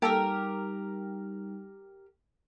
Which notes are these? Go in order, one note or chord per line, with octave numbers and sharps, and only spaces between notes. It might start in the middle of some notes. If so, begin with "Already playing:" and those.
G3 A#3 D#4 G4 A4 A#4